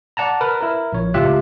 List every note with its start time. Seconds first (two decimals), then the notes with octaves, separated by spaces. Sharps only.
0.17 D5 F#5 A5 A#5
0.41 A#4 B4
0.61 E4 A#4
0.93 A#1 C#5
1.14 C#2 A2 F4 G4 E5 F#6